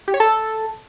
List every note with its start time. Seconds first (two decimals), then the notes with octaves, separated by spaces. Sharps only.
0.08 G4
0.14 C#5
0.20 A4